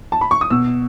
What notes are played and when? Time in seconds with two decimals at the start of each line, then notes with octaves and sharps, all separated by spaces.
0.12 A5
0.21 B5
0.31 C#6
0.41 D#6
0.50 B2 E6